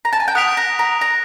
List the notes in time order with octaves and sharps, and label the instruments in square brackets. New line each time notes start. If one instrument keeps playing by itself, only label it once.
[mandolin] A#5
A5
G#5
G5
[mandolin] F#5 [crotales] D#6 F#6 B6 D7 F7
[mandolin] A#5
A#5
A#5